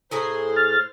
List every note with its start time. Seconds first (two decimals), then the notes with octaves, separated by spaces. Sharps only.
0.11 A2 G#4 C5 A#5
0.56 F6 A6